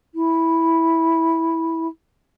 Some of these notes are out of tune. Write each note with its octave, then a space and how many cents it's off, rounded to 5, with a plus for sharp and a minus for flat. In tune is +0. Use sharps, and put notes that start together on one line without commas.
E4 -10